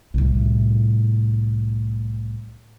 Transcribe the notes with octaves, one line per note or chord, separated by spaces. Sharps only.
C2 A2